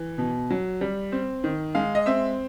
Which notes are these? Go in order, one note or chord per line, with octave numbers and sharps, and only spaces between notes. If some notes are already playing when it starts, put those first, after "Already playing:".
Already playing: E3
B2
F#3
G3
C4
D#3
G#3 F5
D#5
C4 E5